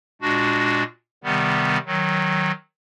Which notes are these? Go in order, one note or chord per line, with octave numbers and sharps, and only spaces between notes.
A#2 G#3 D4 F#4
C3 D#3 G3 B3
D#3 F#3